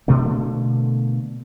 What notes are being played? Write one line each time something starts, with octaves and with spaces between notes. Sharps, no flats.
B2 D3 A3 A#3